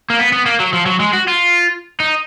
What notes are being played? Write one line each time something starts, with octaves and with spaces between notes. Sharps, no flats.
A#3
B3
B3
A#3
F#3
F3
F#3
G#3
F#4
F4
D#4